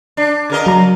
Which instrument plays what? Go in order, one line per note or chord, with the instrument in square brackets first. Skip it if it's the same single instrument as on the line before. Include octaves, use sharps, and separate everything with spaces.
[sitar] D4
C#3 A#4 D#5
[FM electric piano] F#3 A#5